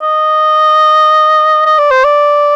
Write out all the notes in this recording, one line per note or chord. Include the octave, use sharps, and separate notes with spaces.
D#5
D#5
D5
C5
D5